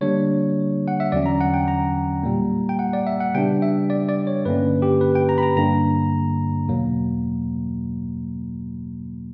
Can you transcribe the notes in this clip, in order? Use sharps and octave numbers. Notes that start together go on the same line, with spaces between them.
D3 G3 A#3 D4 C#5
F#5
E5
E2 D3 F#3 C#4 D5
A#5
F#5
G5
A#5
A#2 G3 A#3
G5
F#5
D5
E5
F#5
C#3 G3 B3 D4 G5
E5
D5
D5
C#5
G2 D3 A#3 C#4 B4
G4
B4
G5
A#5
B5
A#5
G2 D3 A#3 D4 A#5
E2 B2 F#3 A#3